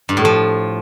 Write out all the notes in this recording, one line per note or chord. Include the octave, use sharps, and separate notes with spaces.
G2
A2
F3